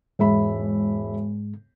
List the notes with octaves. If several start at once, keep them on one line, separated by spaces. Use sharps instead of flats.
E1 G#2 G#3 E5 B5